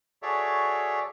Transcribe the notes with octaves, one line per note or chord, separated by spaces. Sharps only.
F#4 G#4 A4 C#5 D5 E5